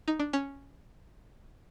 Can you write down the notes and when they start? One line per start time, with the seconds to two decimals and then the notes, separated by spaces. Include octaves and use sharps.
0.08 D#4
0.20 D4
0.33 C#4